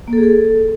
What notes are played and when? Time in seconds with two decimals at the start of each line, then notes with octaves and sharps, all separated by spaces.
0.08 A#3
0.13 A4
0.18 G#4
0.23 A4